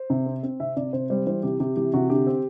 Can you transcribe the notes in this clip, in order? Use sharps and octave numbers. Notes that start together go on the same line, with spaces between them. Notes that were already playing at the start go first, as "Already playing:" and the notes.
Already playing: C5
C3
C4
C4
C3 E5
C3 D5
C3 C5
G3 C5
E3 C5
C3 G4
C3 G4
E3 G4
C3 F#4
D3 G4
C4